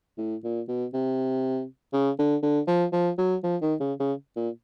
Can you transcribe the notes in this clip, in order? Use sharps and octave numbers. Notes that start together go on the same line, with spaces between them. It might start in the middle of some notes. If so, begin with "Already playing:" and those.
A2
A#2
B2
C3
C#3
D3
D3
F3
F3
F#3
F3
D#3
C#3
C#3
A#2